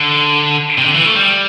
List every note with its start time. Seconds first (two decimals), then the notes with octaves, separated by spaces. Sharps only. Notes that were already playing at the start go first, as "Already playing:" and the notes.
Already playing: D3
0.78 C3
0.84 D3
0.95 E3
1.05 A3
1.16 G3